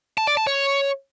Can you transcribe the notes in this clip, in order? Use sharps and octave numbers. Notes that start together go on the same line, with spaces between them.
A5
D5
A5
C#5